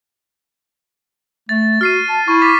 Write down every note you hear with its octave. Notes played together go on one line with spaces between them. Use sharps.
A3 A6
F#4 F6 C7 D#7
A5
E4 C#6
D6 A6 B6